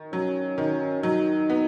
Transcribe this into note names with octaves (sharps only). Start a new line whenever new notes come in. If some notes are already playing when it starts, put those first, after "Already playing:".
Already playing: D#3
F#3 C#4
D#3
F#3 D#4
B3